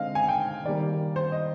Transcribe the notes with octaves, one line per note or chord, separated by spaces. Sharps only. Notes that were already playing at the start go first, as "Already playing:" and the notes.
Already playing: D3 G#3 C4 D#5 F5
G#5
G5
D#3 G3 A#3 D5
C5
D#5